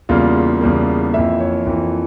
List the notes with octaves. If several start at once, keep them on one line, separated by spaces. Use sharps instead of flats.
E2 C#3 G3 A#3 F4
E2 C#3 G3 A#3
F2 E3 A#3 E5
C#5
F2 E3 A#3